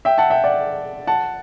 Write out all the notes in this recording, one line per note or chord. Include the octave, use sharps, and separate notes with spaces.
E5 G5
F#5 A5
E5 G5
D5 F#5
F#5 A5